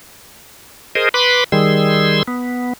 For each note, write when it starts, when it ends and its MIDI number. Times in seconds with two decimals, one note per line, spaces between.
0.95 1.09 68
0.95 1.09 70
0.95 1.09 72
0.95 1.09 75
1.14 1.44 71
1.14 1.44 83
1.14 1.44 84
1.14 1.44 86
1.52 2.23 51
1.52 2.23 55
1.52 2.23 68
1.52 2.23 84
1.52 2.23 88
2.28 2.73 59